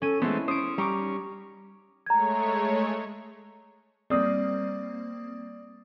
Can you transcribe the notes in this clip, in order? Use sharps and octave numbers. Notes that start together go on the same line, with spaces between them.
C#4 A4 D#7
E3 G#3 A3 B3 C4 E4
C#4 C5 D#6 D7
G3 A#5 C#6 D6
D#4
G#3 A3 C#5 A#5 G#6
G3 A#3 C4 D5 D#6